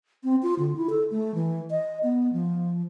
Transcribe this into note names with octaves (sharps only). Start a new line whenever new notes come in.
C4
F4
D3
E4
A4
A3
E3
D#5
B3
F3